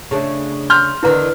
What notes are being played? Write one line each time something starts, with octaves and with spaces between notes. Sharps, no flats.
C#3 A3 D4
C6 F6 G6
E2 D3 D#3 E4 B4 A#5